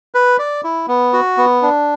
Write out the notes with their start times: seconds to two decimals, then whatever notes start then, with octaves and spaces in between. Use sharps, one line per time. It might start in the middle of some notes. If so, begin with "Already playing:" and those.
0.15 B4
0.39 D5
0.64 E4
0.88 B3
1.13 F#4
1.37 B3
1.62 D4